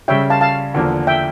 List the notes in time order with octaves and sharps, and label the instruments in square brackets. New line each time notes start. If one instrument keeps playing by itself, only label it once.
[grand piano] C#3 G3 C#4 [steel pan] E5 G5
[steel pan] F5 A5
F5 A5
[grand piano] E2 D3 F3 A#3
[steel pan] E5 G5